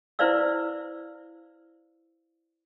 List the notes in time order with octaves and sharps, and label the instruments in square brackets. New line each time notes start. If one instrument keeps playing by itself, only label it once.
[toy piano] E4 B4 C5 D5 F5 E6